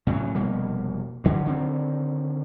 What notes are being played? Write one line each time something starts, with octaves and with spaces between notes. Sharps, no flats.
A2 C#3 F3 F#3
F1 B2 G3 A#3
G2 D3 F#3
D3 D#3 C4